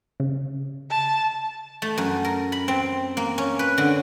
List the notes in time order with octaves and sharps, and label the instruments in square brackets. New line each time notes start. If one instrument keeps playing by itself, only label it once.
[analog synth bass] C#3
[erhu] A5
[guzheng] A3
F#2
A#4
B5
C4
A#3
C#4
B4
D3